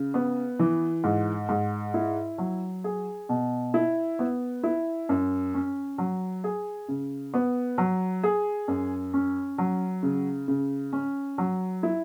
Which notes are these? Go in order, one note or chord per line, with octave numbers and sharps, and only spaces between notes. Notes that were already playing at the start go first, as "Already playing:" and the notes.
Already playing: C#3
B3
E3
G#2
G#2
E4
F#3
G#4
B2
E4
B3
E4
F#2
C#4
F#3
G#4
C#3
B3
F#3
G#4
F#2
C#4
F#3
C#3
C#3
C#4
F#3
E4